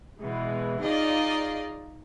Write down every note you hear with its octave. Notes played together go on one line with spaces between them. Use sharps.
B2 E3 G#3
D#4 F4 G#4 D5 D#5 F5